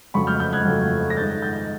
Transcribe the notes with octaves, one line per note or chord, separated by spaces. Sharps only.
F2 C#3 F#3 A3 B5 C#6
F6 G6
F6 G6
F#6 G#6
F2 C#3 F#3 A3
A#6
G2 D#3 G#3 G6 A6
G6 A6